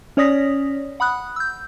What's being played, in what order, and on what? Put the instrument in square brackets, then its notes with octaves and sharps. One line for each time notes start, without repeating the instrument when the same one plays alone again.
[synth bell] C#4 C#5 D5 D#6 A#6 B6
F#5 B5 D#6 F#6
E6 G6